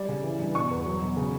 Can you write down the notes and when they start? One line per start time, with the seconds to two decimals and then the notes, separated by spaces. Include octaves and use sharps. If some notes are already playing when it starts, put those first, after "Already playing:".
Already playing: G3 D5
0.09 C#3
0.24 E3
0.40 G2
0.55 B2 C#6
0.71 E2
0.86 F#3
1.01 B2
1.17 C#3